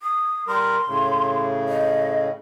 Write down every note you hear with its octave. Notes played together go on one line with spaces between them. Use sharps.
D#6
G3 A#4 C6
A2 C#3
D#5